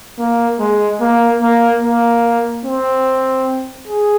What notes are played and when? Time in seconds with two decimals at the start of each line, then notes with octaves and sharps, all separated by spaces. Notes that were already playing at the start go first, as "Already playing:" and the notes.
0.19 A#3
0.60 G#3
1.01 A#3
1.42 A#3
1.83 A#3
2.65 C4
3.88 G#4